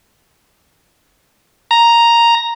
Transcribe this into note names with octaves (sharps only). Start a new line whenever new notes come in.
A#5